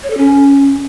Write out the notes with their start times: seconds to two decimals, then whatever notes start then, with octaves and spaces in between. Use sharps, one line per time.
0.03 C#5
0.10 A4
0.17 C#4